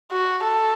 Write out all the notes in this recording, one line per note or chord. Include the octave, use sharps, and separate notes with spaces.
F#4
A4